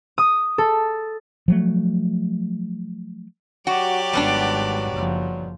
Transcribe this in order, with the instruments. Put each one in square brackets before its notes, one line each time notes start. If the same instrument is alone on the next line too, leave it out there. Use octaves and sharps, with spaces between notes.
[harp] D#6
A4
[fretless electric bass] F3 F#3 A3
[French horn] F#3 [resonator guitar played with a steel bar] F#4 [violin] G4 D5
[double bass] G#1 [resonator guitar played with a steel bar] G3 B3 D4
[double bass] F#1 F3